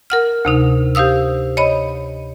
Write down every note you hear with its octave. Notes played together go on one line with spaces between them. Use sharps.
A#4 F#5 F6
D2 C3 D#4
G4 C5 F5 D#6 E6
C#5 D#5 B5